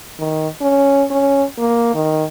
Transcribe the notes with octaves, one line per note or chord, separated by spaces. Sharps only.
D#3
C#4
C#4
A#3
D#3